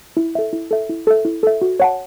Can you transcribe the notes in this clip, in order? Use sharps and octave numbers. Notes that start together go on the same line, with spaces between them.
E4
A4 E5
E4
A4 E5
E4
A4 E5
E4
A4 E5
F#4
C#5 F#5 A5